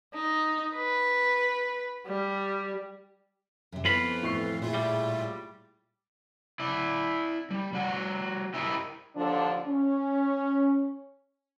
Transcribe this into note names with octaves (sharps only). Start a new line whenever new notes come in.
D#4
B4
G3
F#2 C3
F2 E3 B3 F4 B4 C5 B5
A2 C#6 C7
A#2 E4 F4 G#4
G3
E4 D5
G3
G3 F#4
E4 G4 A#4 D#5 E5
D#2 D3 F3 D4
C#4